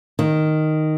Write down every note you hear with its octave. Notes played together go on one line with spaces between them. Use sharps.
D#3